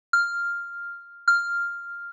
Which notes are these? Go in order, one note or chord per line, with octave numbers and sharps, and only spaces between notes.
F6
F6